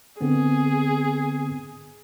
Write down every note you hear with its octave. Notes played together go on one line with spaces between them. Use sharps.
D3 B3 C4 G#4